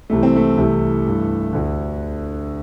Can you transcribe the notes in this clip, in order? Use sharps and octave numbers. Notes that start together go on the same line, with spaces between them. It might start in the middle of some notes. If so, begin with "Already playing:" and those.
C2 C3 E3 A3
C4
A3
C2 C3 E3
G2 E3
D2 D3